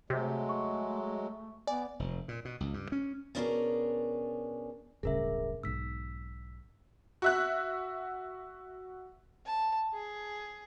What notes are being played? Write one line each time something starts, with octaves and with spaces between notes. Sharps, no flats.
C3 F#3 G#3 A3
C#6
B3 D5 G#5
F1
A#2
B2
C#2
G2
C#4
B2 C#4 D4 E4 G#4 A#4
D1 G1 C#3 G#4 A#4 E5
B1 G#2 E6 B6
F#4 E5 F#6
A5
G#4